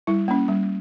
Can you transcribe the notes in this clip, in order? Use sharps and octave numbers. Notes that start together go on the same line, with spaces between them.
G3 E4
A#3 C#4
G3